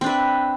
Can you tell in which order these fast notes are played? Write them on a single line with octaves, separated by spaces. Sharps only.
C4 D4 B4 E5